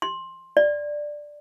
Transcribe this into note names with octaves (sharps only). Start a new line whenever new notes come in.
C6
D5